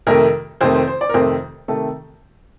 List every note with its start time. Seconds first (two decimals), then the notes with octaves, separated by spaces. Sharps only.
0.07 F2 C3 D#3 A3 A#4
0.61 F2 C3 D#3 A3 C5
0.74 C5
0.88 C5
1.01 D5
1.09 A#4
1.14 F2 C3 D#3 A3 C5
1.68 C3 D#3 A3 A4